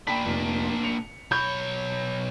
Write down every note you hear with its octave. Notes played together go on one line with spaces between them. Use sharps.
A#2 D4 G5 B5 B6
F1
C#7 F7
B1 C#5 B5 G6